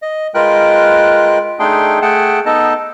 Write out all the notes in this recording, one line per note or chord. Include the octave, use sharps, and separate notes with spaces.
D#5
G#3 F4 A#4 B4 G5 F#6
A3 D4 D#4 G#4 G5 C6
A3 G#4 F#5 G5 A5
B3 D#4 A4 D#5 A5